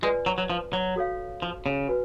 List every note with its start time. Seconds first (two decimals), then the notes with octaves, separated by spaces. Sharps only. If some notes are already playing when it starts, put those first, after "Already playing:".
0.02 G#3 F4 B4 D5 G#5
0.26 F#3
0.38 F#3
0.50 F3
0.73 F#3
0.96 F#4 A4 C#5 F5
1.42 F3
1.66 C#3
1.88 F#4 B4 G#5